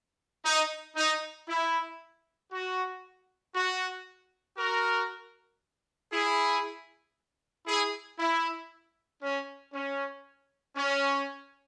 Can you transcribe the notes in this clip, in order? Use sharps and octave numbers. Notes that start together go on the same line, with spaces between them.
D#4
D#4
E4
F#4
F#4
F#4 A#4
E4 G#4
E4 G#4
E4
C#4
C#4
C#4